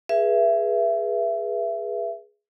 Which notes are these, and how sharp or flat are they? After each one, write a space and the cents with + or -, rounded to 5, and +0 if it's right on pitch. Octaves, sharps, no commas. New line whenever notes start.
G#4 +0 B4 -30 E5 +25